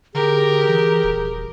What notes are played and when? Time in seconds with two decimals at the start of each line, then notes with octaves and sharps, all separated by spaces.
0.14 D3 G4 G#4 A#4
0.68 E3
1.04 D#1